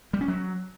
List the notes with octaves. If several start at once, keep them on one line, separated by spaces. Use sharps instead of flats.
G3
C#4
F#3